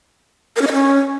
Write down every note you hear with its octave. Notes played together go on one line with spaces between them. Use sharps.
A#4
C#4
D#5
C#4